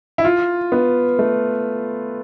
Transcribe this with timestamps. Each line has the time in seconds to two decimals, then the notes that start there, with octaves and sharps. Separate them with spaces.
0.18 E4
0.25 F4
0.72 B3
1.19 A3